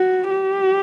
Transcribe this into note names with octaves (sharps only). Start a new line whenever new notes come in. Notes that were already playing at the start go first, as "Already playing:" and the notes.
Already playing: F#4
G4